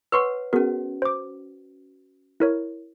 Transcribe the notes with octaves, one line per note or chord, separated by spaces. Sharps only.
B4 C#5 F#5 C6 C#6 E6
B3 C#4 F#4 G#4 A#4
C5 D6
E4 A#4 C#5